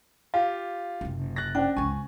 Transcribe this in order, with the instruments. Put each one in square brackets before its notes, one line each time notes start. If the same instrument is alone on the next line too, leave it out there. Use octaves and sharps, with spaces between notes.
[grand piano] F4 G4 [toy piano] F5
[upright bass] F#1 C3
[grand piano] F#6 A6 A#6
[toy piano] C#4 C5 [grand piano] D4 [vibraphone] G5
[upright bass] G1 C#2 [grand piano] G#5 [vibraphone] C#6